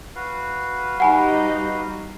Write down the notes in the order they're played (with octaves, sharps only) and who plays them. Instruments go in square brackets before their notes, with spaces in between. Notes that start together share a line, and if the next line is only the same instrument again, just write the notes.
[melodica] F#4 B4 F5
[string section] G3 D#4 [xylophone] F#5 G#5 B5